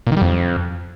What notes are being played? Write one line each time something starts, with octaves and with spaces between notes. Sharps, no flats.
A#2
D#3
G3
F2